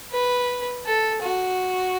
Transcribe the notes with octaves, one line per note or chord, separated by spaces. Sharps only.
B4
A4
F#4